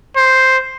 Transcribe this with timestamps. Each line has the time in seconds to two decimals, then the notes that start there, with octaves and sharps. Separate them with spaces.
0.16 C5